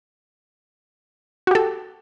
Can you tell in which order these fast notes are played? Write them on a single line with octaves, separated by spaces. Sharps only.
F#4 G4 A4